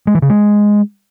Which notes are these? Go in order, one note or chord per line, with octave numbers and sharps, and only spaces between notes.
G#3
E3
C#3
G#3